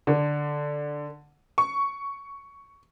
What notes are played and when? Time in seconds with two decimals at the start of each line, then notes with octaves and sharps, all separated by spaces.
0.07 D3
1.58 C#6